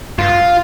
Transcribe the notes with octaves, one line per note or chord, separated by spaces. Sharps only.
G2 F4